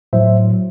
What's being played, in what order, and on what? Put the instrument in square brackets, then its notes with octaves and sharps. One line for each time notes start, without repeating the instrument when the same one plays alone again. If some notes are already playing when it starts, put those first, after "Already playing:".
[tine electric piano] A2 F#3 C5 E5